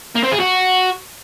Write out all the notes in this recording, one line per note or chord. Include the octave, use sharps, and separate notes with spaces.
A#3
C4
G#4
F#4